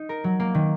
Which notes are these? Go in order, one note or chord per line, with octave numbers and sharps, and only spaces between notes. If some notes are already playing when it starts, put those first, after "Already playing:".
Already playing: D#4
A#4
F#3
A#3
D#3